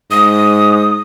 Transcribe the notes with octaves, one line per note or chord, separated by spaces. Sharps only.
G#2 D#6